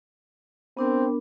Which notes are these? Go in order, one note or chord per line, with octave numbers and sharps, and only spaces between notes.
B3 C4 D4 A#4